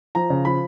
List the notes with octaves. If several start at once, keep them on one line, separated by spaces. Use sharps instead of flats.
F3 A#5
C#3
F3 B5